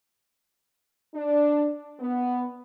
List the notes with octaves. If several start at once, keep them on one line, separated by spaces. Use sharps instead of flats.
D4
B3